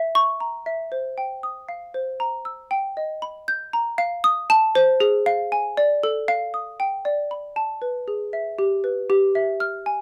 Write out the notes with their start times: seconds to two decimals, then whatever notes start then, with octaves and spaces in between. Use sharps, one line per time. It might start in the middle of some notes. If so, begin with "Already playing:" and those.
Already playing: E5
0.15 C#6
0.40 A#5
0.66 E5
0.92 C5
1.18 G5
1.43 D#6
1.69 F5
1.94 C5
2.20 A#5
2.45 E6
2.71 G5
2.97 D#5
3.22 B5
3.48 G6
3.73 A#5
3.98 F5
4.24 D#6
4.50 A5
4.75 C5
5.00 G#4
5.26 F5
5.52 G#5
5.77 D5
6.03 A4
6.28 F5
6.54 D#6
6.80 G5
7.05 D5
7.31 B5
7.56 A5
7.82 B4
8.08 G#4
8.33 E5
8.59 G4
8.84 B4
9.10 G4
9.35 E5
9.60 F6
9.86 G#5